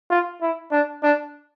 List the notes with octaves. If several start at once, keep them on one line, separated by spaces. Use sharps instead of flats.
F4
E4
D4
D4